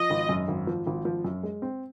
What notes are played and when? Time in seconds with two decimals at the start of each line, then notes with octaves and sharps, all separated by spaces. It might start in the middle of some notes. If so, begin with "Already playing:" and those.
Already playing: F3 D#5
0.10 G#1
0.29 F#2
0.48 G#1
0.67 F3
0.87 G#1
1.05 F3
1.24 F#2
1.43 G#3
1.62 C4